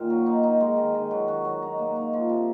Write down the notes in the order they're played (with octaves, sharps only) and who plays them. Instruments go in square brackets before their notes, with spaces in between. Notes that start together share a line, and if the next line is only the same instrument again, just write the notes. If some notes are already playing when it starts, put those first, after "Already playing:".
Already playing: [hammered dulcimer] A#2 D#3
F#3
D#4
D#4
G#3
D#3
D#3
F#3
F#4
F#3
D#4
A#3
D#4
F3
C3